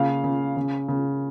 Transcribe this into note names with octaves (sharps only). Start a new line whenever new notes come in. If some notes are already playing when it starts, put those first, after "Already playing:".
Already playing: C#3 A#3 F5
C#3
C#3
C#3